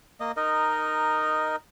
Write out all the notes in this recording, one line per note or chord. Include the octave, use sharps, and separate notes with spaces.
A#3 D#5
D#4 A#4 D#5